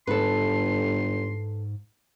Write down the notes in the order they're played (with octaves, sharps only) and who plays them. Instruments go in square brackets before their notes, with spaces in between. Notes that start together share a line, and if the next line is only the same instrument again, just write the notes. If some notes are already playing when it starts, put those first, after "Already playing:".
[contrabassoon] G1 [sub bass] G#2 [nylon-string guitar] A4 B4 [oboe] C6